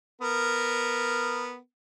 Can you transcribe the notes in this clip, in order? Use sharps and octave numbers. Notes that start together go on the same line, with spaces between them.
B3 A#4